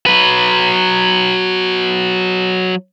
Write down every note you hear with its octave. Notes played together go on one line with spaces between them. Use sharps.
F#3 B4